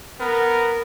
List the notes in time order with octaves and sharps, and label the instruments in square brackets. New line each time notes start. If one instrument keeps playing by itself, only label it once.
[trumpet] B3 [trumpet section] A#4